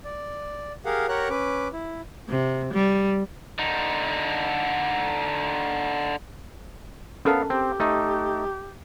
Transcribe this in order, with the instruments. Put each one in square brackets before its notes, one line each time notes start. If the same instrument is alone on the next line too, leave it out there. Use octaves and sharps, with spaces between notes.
[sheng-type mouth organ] D5
G4 G#4 A#4 F5 F#5
G4 A#4 C#5 F#5 A#5 F#6
C#4 B4 D6
E4
[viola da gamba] C3
G3
[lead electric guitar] D3 D#4
[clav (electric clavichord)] B3 F5 [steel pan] C#4 A4 A#4
[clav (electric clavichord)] C4 [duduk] G4
[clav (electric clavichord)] A3 D#4